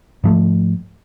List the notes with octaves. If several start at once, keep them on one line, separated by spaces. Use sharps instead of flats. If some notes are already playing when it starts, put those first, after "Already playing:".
G#2 F3 A3